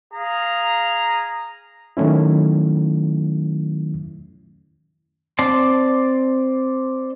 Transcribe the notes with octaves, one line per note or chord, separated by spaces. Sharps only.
G#4 F5 A#5
D#3 F#3 A3 C#4 E4
C4 D5 A5 C6